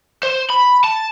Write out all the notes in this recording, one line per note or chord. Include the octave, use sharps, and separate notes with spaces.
C5
B5
A5